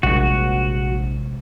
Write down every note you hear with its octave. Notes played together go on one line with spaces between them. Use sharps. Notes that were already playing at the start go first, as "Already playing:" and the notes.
A#1 C3 G3 G#3 F#4